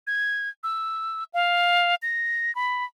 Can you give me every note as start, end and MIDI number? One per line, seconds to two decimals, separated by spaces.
0.07 0.49 92
0.63 1.24 88
1.34 1.95 77
2.02 2.54 94
2.55 2.84 83